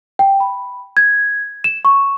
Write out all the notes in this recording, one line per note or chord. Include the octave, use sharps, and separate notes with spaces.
G5
B5
G#6
E7
C#6